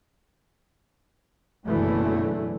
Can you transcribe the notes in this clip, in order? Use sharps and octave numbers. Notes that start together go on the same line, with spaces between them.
F#1 B2 D3 E3 F#3 A3